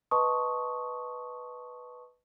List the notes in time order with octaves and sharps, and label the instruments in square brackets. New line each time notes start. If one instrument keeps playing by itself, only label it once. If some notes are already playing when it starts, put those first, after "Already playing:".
[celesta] B4 D#5 A5 C6 C#6 D#6